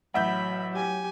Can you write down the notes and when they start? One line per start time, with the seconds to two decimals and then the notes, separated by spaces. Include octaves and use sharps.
0.14 A1 F#3 E5 F#5 B5 G6
0.74 G4 G#5